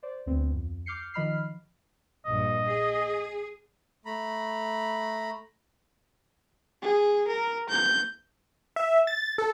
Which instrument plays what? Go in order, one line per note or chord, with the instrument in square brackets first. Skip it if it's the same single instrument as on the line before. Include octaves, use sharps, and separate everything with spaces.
[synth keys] C5 D5
D2 B3 C4
F2
D6 F6 G6 C7 C#7
D#3 F3 D#5 B5 F6 C7
[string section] A#1 G2 [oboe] D#5
[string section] G#4
[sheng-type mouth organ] A3 A#5 B5
[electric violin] G#4
A#4
G6
[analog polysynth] E5
A6
A4